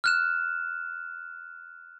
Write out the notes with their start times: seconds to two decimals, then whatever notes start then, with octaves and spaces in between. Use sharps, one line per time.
0.04 F6 F#6 E7